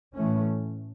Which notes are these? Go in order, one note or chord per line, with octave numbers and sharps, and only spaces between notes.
A2 E3 A3 C#4